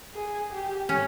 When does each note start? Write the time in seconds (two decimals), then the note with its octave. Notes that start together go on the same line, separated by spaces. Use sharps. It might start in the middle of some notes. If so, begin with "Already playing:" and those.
0.14 G#4
0.52 G4
0.89 C#4